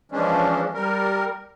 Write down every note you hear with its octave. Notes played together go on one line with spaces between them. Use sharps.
E3 F3 G#3 C#4 D4
G3 A#4